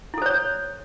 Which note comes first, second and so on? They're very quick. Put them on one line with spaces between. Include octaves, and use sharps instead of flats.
E4 A4 C5 C#5